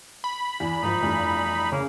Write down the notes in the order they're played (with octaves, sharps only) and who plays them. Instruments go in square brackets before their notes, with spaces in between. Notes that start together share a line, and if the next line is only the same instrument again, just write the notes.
[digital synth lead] B5
[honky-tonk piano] E2
[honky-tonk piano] G#1 F3 [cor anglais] D#4
[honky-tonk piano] F1 E2 G2
[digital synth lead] C#3 [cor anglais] A#3